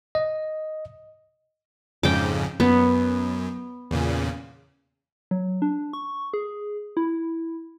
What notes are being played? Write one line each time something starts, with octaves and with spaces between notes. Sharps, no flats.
D#5
F2 G#2 C#3 G5 D6
F#2 B3
E2 A#2 C#3
F#3
D4
C#6
G#4
E4